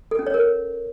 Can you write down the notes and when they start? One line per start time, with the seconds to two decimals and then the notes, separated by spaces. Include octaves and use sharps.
0.11 A4
0.19 C#4
0.27 C#5
0.34 A#4